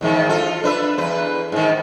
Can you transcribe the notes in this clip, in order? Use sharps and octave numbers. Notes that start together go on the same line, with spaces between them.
E2 G#2 D#3
F4 A4
D4 B4 E5
E2 B4
G#2 D#3